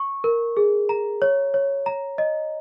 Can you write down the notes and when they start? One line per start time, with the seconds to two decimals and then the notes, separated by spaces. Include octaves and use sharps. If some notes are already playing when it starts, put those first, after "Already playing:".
Already playing: C#6
0.24 A#4
0.57 G#4
0.89 A#5
1.22 C#5
1.54 C#5
1.86 A#5
2.18 D#5